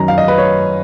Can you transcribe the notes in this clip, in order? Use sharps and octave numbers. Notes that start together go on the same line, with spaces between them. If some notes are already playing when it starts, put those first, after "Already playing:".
Already playing: F#2 D#3 F#3 A#5
F5
D#5
B4
C#5